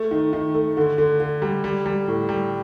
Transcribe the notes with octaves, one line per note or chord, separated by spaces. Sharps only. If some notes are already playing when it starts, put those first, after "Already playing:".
Already playing: A3
D#3
D#3
A3
D3
D3
D3
G3
G3
G3
A2
G3